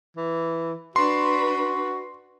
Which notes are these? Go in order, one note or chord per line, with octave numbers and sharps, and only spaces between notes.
E3
D4 F#4 B4 C6